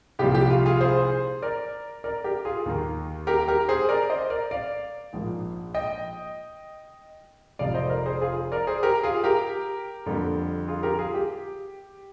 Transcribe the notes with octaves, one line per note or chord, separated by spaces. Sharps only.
C2 A#2 F3 G4
G4
F4
F4 G#4
G#4 C5
A#4 D5
A#4 D5
G4 A#4
F4 G#4
D#2 D#3 A#3
G4 A#4
G4 A#4
G#4 C5
A#4 D5
C5 D#5
A#4 D5
D5 F5
A#1 G#2 F3 A#3
D#5 G5
F1 F2 C3 F3 G#3 D5 F5
C5 D#5
A#4 D5
G#4 C5
F4 G#4
A#4 D5
G#4 C5
G4 A#4
F4 G#4
G4 A#4
F2 D3 G3 A#3
F4 G#4
G4 A#4
F4 G#4
G4